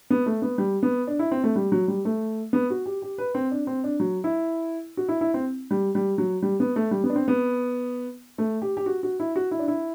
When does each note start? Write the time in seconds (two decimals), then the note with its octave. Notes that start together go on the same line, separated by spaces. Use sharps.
0.10 B3
0.26 A3
0.42 B3
0.58 G3
0.83 B3
1.07 D4
1.19 E4
1.31 C4
1.44 A3
1.56 G3
1.72 F#3
1.88 G3
2.05 A3
2.53 B3
2.70 F#4
2.86 G4
3.02 G4
3.18 B4
3.35 C4
3.51 D4
3.67 C4
3.84 D4
4.00 F#3
4.24 E4
4.97 F#4
5.09 E4
5.21 E4
5.34 C4
5.71 G3
5.95 G3
6.18 F#3
6.42 G3
6.60 B3
6.76 A3
6.91 G3
7.04 B3
7.10 D4
7.16 C4
7.28 B3
8.38 A3
8.62 G4
8.77 G4
8.86 F#4
9.03 F#4
9.20 E4
9.36 F#4
9.51 E4
9.59 D4
9.68 E4